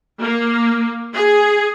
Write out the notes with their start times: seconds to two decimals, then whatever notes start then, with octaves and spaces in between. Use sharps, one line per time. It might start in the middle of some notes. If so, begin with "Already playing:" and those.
0.22 A#3
1.15 G#4